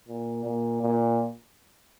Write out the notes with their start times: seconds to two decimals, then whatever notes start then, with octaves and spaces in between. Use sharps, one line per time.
0.08 A#2
0.44 A#2
0.81 A#2